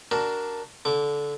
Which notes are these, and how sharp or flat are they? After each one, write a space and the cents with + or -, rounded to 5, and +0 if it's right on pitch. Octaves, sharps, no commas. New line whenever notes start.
D4 +0 F#4 +25 A#4 +0
D3 -15 D6 -25